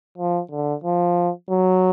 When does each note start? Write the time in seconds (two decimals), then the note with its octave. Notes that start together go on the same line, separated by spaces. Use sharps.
0.18 F3
0.51 D3
0.84 F3
1.50 F#3